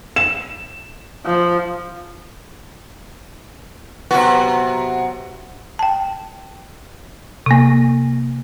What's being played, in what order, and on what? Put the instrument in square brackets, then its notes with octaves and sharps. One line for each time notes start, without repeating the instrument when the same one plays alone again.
[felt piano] E7
[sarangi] F3
[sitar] C3 F#4 [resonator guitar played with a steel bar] F#3 B3
[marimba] G5 A5
C3 A#3